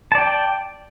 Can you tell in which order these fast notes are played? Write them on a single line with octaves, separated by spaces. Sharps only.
A5 D5 G5